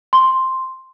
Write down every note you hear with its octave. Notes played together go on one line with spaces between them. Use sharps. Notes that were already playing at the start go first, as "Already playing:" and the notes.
C6